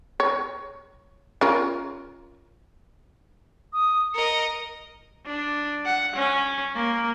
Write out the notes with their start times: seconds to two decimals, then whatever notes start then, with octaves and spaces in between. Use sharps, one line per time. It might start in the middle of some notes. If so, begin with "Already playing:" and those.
0.20 C#5
1.41 C#4 F4 A#4
3.73 D#6
4.14 A#4 D#5 C#7
5.26 D4
5.85 F#5
6.15 C#4
6.75 A#3